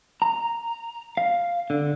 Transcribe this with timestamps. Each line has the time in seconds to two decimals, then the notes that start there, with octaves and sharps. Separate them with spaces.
0.22 A#5
1.17 F5
1.70 D3